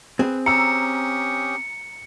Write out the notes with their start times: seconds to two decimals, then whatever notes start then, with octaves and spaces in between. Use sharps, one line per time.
0.19 C4 G#4 B4
0.46 C#4 G4 A#5 D#6 E6 C#7